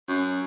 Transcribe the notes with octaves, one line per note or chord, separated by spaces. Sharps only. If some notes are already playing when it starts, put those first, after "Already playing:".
F#2